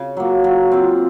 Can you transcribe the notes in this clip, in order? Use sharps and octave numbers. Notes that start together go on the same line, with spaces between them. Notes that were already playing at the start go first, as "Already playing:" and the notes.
Already playing: C#3
F#3 A#3
F#3
C4 F4